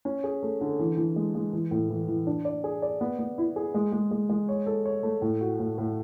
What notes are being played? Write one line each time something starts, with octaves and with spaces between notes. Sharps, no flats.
C#4
G#4
A3
D3
E3
E3
G#3
G#3
E3
A2
E3
E3
D4
D5
G#4
D5
B3
B3
E4
G#4
G#3
G#3
G#3
G#3
C#5
A4
C#5
A3
A2
F#4
A2
A2